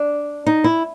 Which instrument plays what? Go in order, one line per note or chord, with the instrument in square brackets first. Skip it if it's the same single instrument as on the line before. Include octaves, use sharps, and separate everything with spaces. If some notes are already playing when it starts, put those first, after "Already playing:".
Already playing: [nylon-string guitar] D4
D#4
E4